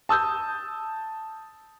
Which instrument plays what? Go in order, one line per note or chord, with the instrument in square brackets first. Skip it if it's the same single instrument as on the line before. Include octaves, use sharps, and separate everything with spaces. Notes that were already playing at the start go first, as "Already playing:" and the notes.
[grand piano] A5 D#6 E6 G6